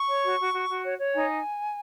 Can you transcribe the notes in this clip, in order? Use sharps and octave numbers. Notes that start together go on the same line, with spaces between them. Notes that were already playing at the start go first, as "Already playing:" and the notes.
Already playing: C#6
C#5
F#4
F#4
F#4
F#4
C#5
C#5
D#4 G#5